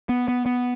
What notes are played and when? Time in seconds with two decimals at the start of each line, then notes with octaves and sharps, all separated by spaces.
0.09 B3
0.28 B3
0.46 B3